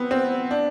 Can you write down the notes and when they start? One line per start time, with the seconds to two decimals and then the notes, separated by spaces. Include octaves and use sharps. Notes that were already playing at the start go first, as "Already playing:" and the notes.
Already playing: B3 C4
0.11 C4
0.51 D4